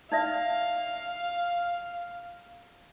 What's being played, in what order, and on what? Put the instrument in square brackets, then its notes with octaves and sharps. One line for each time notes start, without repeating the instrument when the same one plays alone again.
[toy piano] D#4 D5 E5 [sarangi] F5